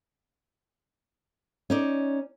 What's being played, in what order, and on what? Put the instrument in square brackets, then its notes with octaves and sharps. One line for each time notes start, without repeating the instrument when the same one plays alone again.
[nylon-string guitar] C#4 D#4 D5